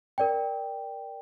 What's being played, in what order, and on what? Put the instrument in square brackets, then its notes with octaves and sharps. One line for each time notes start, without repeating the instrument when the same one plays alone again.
[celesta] A#4 D5 G5